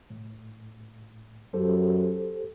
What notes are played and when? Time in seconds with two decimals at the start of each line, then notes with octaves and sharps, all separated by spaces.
0.10 A2
1.53 F#2 G4 A4 C5